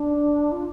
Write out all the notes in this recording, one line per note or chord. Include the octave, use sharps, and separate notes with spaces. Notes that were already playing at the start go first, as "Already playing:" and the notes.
Already playing: D4
F4